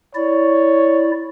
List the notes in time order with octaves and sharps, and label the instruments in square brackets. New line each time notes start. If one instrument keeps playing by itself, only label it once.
[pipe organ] E4 D5 [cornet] C#5